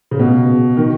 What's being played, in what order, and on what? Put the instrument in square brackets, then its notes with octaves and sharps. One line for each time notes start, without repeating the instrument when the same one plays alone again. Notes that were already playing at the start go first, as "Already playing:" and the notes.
[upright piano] C#3
B2
D#3